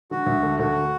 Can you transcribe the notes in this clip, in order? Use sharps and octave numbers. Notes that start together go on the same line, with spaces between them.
D3 F#4
D2
A3
D2 F#4